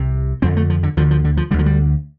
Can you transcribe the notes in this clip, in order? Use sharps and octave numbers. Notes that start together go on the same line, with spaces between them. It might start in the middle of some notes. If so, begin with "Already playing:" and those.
Already playing: C2 C3
F2 D3 C4
A3
F3
D3
D2 D3 F3
F3
D3
F3
D2 D3 G3
F3
G3